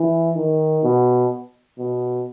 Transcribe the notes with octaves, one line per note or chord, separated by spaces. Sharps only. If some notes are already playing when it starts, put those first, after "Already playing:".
Already playing: E3
D#3
B2
B2